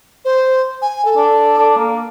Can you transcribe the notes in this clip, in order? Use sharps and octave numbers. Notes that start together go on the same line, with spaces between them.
C5
G#5
A4
D4
D4
A#3